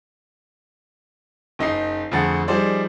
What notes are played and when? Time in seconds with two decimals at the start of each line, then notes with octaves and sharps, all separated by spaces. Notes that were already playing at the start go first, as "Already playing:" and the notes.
1.59 F#1 D#4 D#5 C7
2.11 F2 D3 A3 G#4 F#5 A6
2.48 F3 G3 D#4 G#4 C5 D5